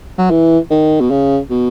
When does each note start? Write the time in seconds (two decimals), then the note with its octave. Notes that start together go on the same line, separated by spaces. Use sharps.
0.18 F#3
0.30 E3
0.70 D#3
1.00 B2
1.10 C#3
1.50 B2